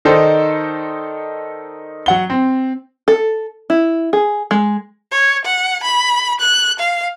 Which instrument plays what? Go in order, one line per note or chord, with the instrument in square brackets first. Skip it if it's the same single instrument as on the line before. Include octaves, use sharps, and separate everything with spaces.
[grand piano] D#3 D#4 A4 C5 D5
F#3 F#5 G7
C4
[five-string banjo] A4
E4
G#4
G#3
[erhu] C#5
F#5
B5
F#6
F5